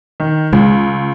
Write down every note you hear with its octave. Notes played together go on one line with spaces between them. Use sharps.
D#3
C#2 G#3